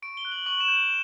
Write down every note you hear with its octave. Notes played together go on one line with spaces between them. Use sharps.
C#6 D7
G7
F#6
F#7
C#6 F#7
E7
G6
E7